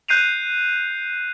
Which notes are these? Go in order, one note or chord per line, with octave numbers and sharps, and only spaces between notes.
F#6 G6 C7 D#7 F7